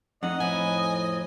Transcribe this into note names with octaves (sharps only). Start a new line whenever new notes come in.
F2 D#4 D#5 F#5
A2 F3 E4 G#5